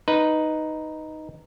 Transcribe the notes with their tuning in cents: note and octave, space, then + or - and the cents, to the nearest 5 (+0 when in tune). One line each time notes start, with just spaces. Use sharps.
D#4 +0 B4 +0